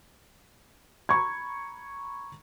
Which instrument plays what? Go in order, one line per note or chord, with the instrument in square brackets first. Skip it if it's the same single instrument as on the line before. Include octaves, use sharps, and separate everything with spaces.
[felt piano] A#5 B5 C#6 G#6